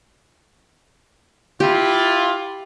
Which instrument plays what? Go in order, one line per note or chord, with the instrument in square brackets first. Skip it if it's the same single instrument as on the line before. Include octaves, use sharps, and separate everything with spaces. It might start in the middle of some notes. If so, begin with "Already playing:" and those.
[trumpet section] E4 F4 [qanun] G4